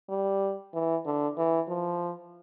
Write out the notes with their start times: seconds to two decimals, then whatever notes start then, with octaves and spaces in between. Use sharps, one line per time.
0.09 G3
0.74 E3
1.06 D3
1.38 E3
1.68 F3